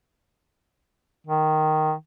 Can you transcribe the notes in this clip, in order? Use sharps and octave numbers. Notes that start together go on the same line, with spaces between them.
D#3